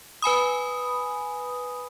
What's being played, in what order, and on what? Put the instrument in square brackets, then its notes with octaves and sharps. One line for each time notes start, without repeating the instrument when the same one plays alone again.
[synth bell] B4 G#5 B5 D#6